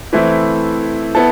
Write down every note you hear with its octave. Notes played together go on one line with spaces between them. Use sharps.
E3 A3 C4 E4
B3 E4 A4